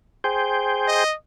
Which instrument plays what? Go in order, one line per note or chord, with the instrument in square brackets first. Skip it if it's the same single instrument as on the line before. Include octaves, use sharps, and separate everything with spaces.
[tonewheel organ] G#4 C5 G5
[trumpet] D#5